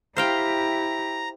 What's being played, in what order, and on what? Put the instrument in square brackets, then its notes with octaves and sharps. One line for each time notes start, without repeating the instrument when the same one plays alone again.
[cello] E4 G4 [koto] C5 F5 G5 [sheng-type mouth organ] A#5